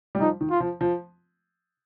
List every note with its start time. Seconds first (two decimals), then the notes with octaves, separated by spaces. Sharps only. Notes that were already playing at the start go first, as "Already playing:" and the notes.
0.15 G3
0.20 F3 D#4
0.41 D#3
0.50 F4
0.60 F3
0.81 F3